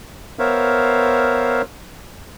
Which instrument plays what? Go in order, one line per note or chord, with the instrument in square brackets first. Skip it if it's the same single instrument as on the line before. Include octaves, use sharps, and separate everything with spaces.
[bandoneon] B3 A#4 C5 C#5 E5 F5